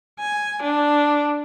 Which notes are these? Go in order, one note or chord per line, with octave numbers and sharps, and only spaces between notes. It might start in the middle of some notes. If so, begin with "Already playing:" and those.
G#5
D4